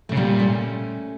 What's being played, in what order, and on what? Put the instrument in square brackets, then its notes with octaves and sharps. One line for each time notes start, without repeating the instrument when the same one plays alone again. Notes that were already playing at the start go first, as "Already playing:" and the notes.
[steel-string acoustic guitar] A3
[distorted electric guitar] C#3
[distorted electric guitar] A#2 [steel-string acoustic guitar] G3 A#3
[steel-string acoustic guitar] A3 C#4